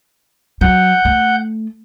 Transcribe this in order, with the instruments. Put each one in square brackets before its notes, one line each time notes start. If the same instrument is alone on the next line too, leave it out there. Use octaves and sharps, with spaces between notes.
[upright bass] F#3 [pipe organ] F#5 G6
[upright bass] A3